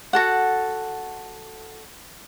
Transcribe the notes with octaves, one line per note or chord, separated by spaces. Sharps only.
F#4 A4 F#5